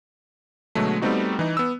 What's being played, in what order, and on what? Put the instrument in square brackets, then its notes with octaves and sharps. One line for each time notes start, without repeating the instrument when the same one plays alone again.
[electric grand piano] B2 D3 F#3 G#3 A3
G3 A3 B3 C4 D#4 F#4
E3 D#4
B3 E6